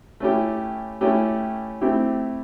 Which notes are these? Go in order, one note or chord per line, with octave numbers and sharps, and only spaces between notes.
A3 C#4 E4 G4
A3 C#4 E4 G4
A3 C4 E4 G4